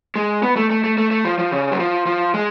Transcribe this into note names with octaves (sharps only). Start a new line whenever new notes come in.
G#3
B3
A3
A3
A3
A3
A3
F3
F3
C#3
F#3
F3
F3
G#3